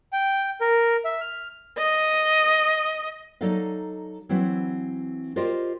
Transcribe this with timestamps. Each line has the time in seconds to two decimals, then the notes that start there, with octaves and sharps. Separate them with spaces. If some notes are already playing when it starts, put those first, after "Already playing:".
0.13 G5
0.61 A#4
1.05 E5
1.21 F6
1.77 D#5
3.41 F#3 D#4 A4 D5 D#5 F5
4.29 E3 F#3 C4 E4
5.36 F4 G4 A#4 C5 D5 D#5